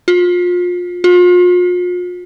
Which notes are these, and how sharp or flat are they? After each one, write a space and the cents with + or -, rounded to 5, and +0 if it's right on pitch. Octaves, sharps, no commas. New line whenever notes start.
F4 +30
F4 +40